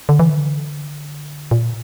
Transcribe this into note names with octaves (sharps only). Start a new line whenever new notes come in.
D3
E3
D3
A#2